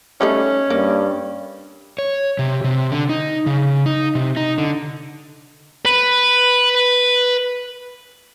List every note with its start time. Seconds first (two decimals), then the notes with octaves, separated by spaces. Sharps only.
0.21 G3 A3 C#4 D#4
0.70 G2 A#3
1.98 C#5
2.39 C3
2.64 C3
2.92 D3
3.09 D#4
3.46 C#3
3.86 D#4
4.15 C3
4.37 D#4
4.58 D3
5.85 B4 B5